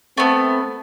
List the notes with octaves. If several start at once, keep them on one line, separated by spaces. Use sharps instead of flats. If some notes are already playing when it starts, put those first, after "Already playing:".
A3 B3 C4